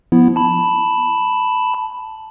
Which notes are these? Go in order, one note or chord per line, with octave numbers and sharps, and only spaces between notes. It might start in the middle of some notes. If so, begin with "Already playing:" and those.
F3 B3 E4
A5 B5